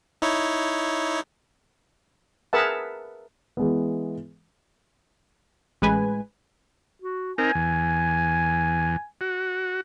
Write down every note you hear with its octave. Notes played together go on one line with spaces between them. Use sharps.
D#4 E4 C#5
G#4 A#4 B4 E5 F#5 A5
E3 G#3 B3
A1 G#3 B4 G#5
F#4
C4 D#4 A#4 G#5
E2
F#4